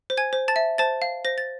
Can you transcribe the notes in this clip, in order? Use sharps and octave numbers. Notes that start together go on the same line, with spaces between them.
C5
G#5 G#6
C5
A5 A6
E5
C5 A5 A6
F5
C5 A#6
A6